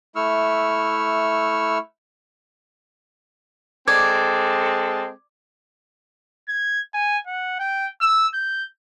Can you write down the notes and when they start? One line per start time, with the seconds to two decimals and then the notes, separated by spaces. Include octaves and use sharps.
0.16 A3 E4 C#6 E6 F6
3.88 G#3 C4 A4 D5 G#6
6.49 G#6
6.94 G#5
7.27 F#5
7.59 G5
8.01 E6
8.34 G6